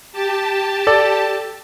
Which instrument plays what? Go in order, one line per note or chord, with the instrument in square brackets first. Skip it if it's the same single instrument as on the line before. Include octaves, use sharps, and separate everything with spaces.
[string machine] G4 A5
[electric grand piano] A4 D5